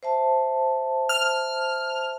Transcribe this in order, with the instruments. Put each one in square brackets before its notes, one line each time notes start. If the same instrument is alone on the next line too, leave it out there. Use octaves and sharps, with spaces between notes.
[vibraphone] C5 E5 A5
[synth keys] F6